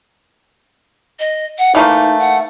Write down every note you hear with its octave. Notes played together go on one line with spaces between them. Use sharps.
D#5
F#5
E3 A3 A#3 D#4
F#5